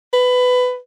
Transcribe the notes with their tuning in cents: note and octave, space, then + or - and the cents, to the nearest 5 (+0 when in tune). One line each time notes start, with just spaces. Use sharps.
B4 +15